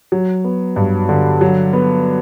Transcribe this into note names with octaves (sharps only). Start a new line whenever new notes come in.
F#3
B3
G2
D3
F#3
B3